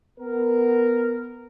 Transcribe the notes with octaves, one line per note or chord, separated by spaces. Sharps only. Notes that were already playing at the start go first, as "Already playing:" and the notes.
B3 A#4